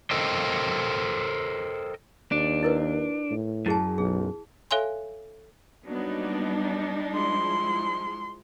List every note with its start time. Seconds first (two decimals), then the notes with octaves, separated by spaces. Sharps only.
0.11 A4 A#4 C5 D#5 G5
2.32 D#2 D4
2.63 E4 A#4 B4
3.31 A2
3.66 F#2 E4 G#4 A5
3.98 B1 G#4
4.71 A4 C#5 E5 F5 G#5 C6
5.86 F#3 G3 A#3 B3 D4 D#4
7.16 F3 G#3 E4 C6